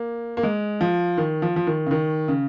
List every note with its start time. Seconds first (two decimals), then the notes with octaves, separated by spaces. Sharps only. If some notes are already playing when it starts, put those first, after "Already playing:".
Already playing: A#3
0.37 A#3
0.43 G#3
0.81 F3
1.17 D#3
1.42 F3
1.56 F3
1.67 D#3
1.86 C#3
1.91 D#3
2.28 C#3